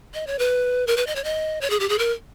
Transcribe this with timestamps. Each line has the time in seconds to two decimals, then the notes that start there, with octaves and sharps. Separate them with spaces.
0.14 D#5
0.27 C#5
0.39 B4
0.87 A#4
0.97 B4
1.07 D#5
1.16 C#5
1.24 D#5
1.61 C#5
1.70 G#4
1.80 G4
1.89 G#4
1.99 A#4